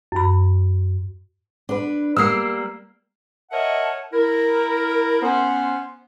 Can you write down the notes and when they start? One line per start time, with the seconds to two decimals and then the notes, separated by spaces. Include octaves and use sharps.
0.12 F#2 B5
1.69 D4 B4
2.17 G3 A#3 E6 F6 C7
3.51 A#4 C#5 D#5 E5 F#5 A5
4.13 E4 A#4
5.22 B3 C#4 C5